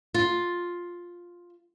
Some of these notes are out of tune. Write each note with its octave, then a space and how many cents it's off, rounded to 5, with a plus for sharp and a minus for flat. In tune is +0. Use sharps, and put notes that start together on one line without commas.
F4 +5